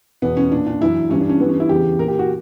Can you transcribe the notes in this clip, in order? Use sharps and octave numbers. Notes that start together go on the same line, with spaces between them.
E2 B2 B3
C#4
A#2 D4
D4
F#2 E3 E4
G2 E3 C#4
D4
C#4
G2 E3 B3
C#4
E4
E2 C#3 E3 G4
A#2 A#4
G4
F#4